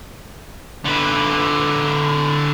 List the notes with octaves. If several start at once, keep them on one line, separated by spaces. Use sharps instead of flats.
D3 B4